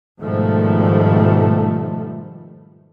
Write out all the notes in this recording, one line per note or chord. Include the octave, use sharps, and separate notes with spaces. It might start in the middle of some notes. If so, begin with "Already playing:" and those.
G#2 B2 D#3 F3 G3 A3